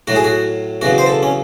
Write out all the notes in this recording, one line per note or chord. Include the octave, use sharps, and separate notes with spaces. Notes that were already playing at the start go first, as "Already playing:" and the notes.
A2 F#3 F#4
G#4
F#4
E2 C#3 F#3 F#4
C5
A4
C#4